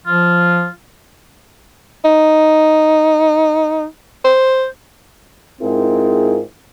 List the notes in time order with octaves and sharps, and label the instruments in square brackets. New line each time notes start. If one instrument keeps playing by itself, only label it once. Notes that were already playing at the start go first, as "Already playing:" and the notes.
[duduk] F3 [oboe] F4
[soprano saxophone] D#4
C5
[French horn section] G#2 C4 E4 F4 G#4 A#4